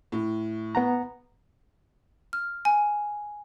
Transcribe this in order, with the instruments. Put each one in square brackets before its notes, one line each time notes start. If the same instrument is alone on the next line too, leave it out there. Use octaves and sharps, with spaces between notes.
[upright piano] A2
[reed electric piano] B3 F#5 A#5
[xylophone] F6
G#5